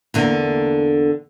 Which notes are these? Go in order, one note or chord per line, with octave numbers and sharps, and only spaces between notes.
E2 D3 A#3